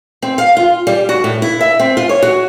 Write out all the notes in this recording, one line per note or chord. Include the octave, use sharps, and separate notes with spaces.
C4
F5
F4
G3
F#4
A2
E4
E5
C4
F4
C#5
F#4